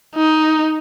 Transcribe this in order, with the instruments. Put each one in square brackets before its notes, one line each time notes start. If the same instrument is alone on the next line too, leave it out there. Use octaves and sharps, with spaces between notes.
[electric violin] D#4